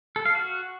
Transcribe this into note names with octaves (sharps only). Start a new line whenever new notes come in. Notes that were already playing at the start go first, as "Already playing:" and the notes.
A4
F5
F#4